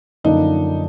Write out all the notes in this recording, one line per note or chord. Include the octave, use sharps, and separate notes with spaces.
F#2 D3 F3 A#3 D4 D#4